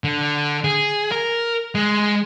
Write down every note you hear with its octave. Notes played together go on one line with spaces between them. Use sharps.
D3
G#4
A#4
G#3